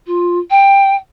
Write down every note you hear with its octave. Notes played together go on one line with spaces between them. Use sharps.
F4
G5